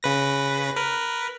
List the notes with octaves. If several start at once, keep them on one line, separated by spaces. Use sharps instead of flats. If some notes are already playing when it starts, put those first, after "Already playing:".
C#3 B4 A#6
A#4 B4